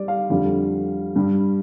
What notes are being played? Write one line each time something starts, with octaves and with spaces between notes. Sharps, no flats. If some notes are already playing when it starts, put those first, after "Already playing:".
Already playing: G3 D5
F5
F2 D3 G3
G2 G3